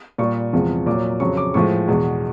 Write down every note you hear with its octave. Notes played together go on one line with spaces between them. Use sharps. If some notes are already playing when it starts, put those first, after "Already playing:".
A#2 G3 C#6
E2 C3 F3 G#3
A#2 F#3 D6
F2 C#3 F#3 C#6
D6
A2 F3 G#3 C#6
E2 B2 G#3